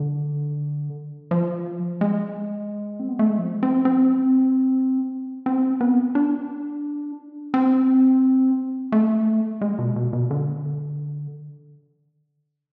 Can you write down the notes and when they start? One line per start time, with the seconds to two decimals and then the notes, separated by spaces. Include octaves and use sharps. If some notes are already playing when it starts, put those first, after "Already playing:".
Already playing: D3
1.31 F3
2.01 G#3
3.00 C4
3.09 B3
3.19 A3
3.29 G#3
3.39 F3
3.63 C4
3.85 C4
5.46 C4
5.81 B3
6.15 D4
7.54 C4
8.92 A3
9.61 G#3
9.79 B2
9.96 B2
10.13 B2
10.31 D3